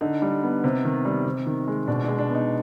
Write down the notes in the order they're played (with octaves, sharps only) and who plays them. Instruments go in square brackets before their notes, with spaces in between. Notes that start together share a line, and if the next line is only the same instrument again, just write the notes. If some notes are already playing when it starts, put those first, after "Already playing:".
[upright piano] D3 D#4
G3
B3
C3
D#3
G3
C3
D#3
G#3
B2 D4
G#3 D4
D4
B3
D#4